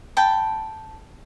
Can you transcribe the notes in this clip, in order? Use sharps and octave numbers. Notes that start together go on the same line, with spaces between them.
G5 A5 B5